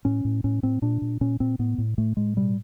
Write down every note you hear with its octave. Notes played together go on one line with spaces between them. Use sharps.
A2 C#4
A2
A2 C#4
A2 C4
A#2 D4
A#2
A#2 C#4
A#2 C4
A2 B3
A2
A2 A3
A2 G#3
B2 G3